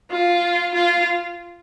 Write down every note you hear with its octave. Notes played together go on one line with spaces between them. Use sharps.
F4
F4